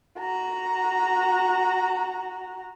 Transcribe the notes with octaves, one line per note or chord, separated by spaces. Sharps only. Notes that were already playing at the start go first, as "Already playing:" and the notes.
F#4 A#5